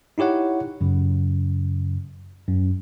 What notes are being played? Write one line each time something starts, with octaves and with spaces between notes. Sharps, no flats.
D#4 E4 G4 C#5 F#5
F#2 C#3
F#2